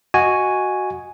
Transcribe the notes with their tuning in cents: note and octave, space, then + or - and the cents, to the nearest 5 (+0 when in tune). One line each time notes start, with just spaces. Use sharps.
F#4 +0 D#5 +0 G#5 +0